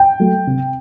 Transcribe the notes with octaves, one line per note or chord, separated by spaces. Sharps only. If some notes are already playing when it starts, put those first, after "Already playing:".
Already playing: G5
F#3 A3
C3